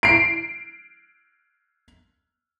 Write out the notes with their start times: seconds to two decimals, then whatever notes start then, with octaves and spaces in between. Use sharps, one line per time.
0.03 C7 D7